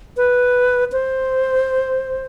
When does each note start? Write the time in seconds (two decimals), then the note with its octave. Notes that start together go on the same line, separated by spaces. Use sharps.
0.17 B4
0.92 C5